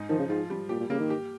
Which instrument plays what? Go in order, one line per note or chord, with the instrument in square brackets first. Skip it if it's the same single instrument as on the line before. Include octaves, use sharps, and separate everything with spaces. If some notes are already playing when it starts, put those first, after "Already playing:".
Already playing: [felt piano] G#2 D#4
[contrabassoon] D#3 [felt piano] F3
[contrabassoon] C#3
[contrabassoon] G#2 [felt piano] F4
[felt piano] G3
[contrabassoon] A#2 [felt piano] G4
[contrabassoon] A#2
[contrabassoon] C#3 [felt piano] A#3
[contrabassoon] D#3
[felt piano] G4